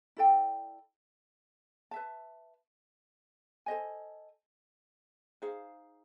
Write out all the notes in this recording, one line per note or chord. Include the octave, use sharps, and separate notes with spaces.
E4 A4 D5 G5
B4 E5 A5
A4 C5 D#5 G#5
D#4 G#4 C5 F5